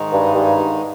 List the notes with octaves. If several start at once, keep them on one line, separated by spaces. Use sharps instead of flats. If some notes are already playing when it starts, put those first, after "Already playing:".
Already playing: G#2 D#3 G#3 D#4
G2
G2